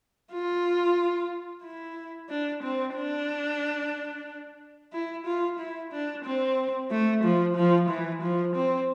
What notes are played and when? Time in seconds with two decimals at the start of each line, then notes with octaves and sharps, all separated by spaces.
0.32 F4
1.64 E4
2.29 D4
2.62 C4
2.96 D4
4.93 E4
5.26 F4
5.59 E4
5.92 D4
6.25 C4
6.90 A3
7.23 F3
7.56 F3
7.89 E3
8.22 F3
8.55 C4